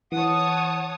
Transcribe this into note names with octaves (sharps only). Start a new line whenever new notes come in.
E3 C#5 F#5 A5 D#6